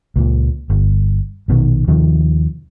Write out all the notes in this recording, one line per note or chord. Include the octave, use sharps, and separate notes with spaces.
C#2 A#2
G1
A#1 B2 D#3
D#2 C3 D#3 F3